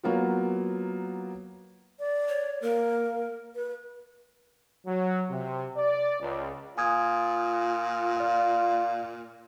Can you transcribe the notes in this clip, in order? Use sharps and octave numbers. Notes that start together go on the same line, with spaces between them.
F#3 A#3 B3 F4 F#4
D5
C#5
A#3 A#4
B4
F#3
C3
D5
C#2
A#2 F4 G#5 D#6 G#6
D5 F5